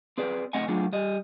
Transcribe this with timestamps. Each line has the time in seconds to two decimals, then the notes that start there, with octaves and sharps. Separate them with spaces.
0.18 C4 G#4 B4 D5
0.53 A3 C4 D#5 F#5 G#5
0.68 F#3 A3 D4 F4 G#4
0.93 G3 D#5